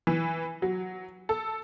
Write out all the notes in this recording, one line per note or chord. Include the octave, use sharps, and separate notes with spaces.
E3
F#3
A4